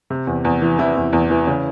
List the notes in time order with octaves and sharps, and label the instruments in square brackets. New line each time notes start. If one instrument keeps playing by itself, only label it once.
[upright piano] C3
E2
E2
E3
C3 E3 E4
E2
E2
E3
C#3